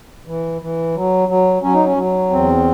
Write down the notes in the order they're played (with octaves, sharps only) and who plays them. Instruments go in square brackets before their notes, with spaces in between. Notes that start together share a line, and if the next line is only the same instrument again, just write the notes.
[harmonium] E3
E3
F#3
F#3
F#3 C#4
D#4
C#4
F#3
E2 C4